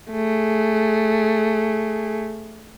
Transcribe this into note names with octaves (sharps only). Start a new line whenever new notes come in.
A3 G#4